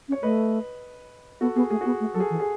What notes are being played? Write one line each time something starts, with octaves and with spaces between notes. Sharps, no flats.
C#4
C#5
A3 B4 D#5
B3 F#4 A4
B3 G#4
A3 G#4
F#4
B3 G#4
A3
F#3 A4
G#4
E3
G#4